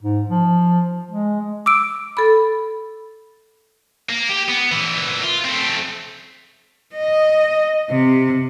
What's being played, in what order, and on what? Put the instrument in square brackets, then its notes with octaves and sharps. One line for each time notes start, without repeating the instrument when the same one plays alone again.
[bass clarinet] G#2
F3
G#3
[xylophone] D6 E6 D7
[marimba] A4 B5
[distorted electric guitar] A#3
G4
B3
A#2 E3
F4
A3 C4
[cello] D#5
C3